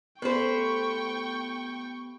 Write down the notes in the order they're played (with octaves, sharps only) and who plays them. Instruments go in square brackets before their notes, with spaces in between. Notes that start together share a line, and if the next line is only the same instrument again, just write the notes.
[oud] A3 [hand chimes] B3 G4 B5 [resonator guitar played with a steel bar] B4 C5 [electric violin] G5 C#6